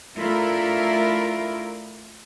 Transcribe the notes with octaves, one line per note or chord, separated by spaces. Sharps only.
A3 D4 E4 F4 A#4